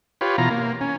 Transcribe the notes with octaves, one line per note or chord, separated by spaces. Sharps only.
F4 G4 B4 C#5
B2 E3 F4 A#5
A#3
C#4